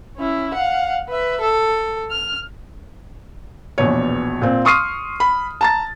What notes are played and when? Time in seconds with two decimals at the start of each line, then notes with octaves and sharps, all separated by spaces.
0.17 C#4 E4
0.55 F5 F#5
1.09 B4 E5
1.41 A4
2.11 F6
3.78 A#1 E2 B2 C#5
4.42 A#2 C4
4.65 C6 C#6 D#6 F6 C7 D#7
5.20 B5
5.61 A5 A#5 A6